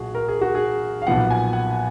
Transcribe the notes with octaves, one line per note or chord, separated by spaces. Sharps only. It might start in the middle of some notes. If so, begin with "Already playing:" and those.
Already playing: B1 A#2 F#4 G#4
A#4
G#4
F#4
G#4
F5
B1 A#2 F3 B3 F#5
G#5
F#5